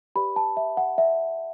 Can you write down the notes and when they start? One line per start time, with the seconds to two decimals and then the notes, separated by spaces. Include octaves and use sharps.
0.16 G4 B4 D5 B5
0.36 A5
0.57 E5
0.77 F#5
0.98 E5